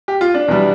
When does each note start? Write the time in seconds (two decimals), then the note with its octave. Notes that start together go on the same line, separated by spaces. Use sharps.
0.08 G4
0.21 F4
0.34 D4
0.48 E2 B2 G3